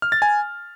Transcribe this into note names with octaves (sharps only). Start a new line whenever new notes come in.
F6
A6
G#5